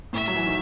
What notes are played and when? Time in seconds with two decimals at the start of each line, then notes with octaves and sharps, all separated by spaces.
0.13 A2 E5
0.28 F#3
0.36 E3
0.46 D#3